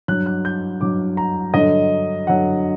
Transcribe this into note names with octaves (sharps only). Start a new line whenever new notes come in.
G2 F#3 F#6
F#6
G6
G2 F#3 D6
A#5
G2 D3 F#3 D#5
D3 F#3 F#5